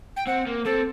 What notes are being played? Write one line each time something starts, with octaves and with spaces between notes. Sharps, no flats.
G5
C4 F#5
A#3
C4 A4